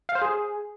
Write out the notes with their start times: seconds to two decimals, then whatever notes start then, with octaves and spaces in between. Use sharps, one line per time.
0.09 F5
0.15 C5
0.22 G#4